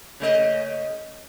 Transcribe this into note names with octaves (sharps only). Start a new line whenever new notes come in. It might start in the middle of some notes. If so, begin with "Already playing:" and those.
C#3 A3 D#5